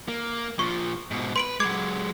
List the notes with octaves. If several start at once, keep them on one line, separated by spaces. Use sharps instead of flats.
A#3
A#2 F3 C#6
G#2 B2
B4 C6 D7 F#7
F#3 G#3 D6 G#6